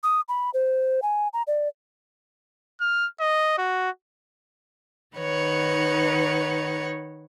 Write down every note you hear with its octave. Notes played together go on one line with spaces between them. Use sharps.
D#6
B5
C5
G#5
A#5
D5
F6
D#5
F#4
D#3 D#4 B4 C#5 F#5